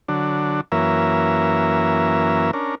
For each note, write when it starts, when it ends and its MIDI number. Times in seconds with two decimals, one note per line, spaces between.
0.08 0.61 50
0.08 0.61 54
0.08 0.61 62
0.72 2.51 42
0.72 2.51 52
0.72 2.51 58
0.72 2.51 61
0.72 2.51 70
0.72 2.51 76
2.53 2.75 61
2.53 2.75 62
2.53 2.75 70